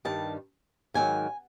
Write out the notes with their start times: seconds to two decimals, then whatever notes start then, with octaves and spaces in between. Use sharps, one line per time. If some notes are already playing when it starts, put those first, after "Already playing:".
0.05 G2 D#3 G3 A5
0.94 G#2 D#3 F#3 G#5